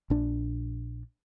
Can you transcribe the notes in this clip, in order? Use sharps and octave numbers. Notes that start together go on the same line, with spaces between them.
A#1 D4